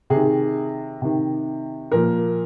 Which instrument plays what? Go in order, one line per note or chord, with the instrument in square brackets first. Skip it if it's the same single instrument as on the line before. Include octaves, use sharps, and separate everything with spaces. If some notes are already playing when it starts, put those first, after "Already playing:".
[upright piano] C3 G#4
D#3
C3 D#3
A#2 F3 A#4